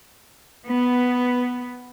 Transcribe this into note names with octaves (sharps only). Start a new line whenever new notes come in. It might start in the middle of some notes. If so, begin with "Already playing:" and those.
B3